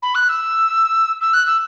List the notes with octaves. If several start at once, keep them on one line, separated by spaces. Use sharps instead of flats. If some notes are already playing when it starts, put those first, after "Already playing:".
B5
F#6
E6
E6
F#6
E6